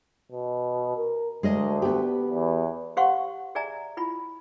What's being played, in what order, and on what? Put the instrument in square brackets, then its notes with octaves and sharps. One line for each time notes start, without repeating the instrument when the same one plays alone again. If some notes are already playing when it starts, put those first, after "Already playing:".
[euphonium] B2
A#4
[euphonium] D2 [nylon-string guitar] G#3 A#4 D#5
[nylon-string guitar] B3 G4
[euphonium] E2
[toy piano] G4 C5 F5 F#5 C6 C#6
G#4 D5 E5 G#5 A#5
E4 F4 B5